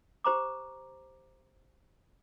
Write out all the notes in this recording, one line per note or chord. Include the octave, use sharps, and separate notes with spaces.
G4 C5 A#5 D6